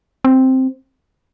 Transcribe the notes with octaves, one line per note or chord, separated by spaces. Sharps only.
C4